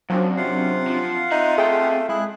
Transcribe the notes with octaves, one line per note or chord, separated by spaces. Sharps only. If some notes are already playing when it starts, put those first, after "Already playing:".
F#2 F3 F#3 C4 D4
C3 F4 F5 F#5
F3
C4 D#4 E5 F#6
A3 G#4 G5 A5
G#3 E4 G#4 F#6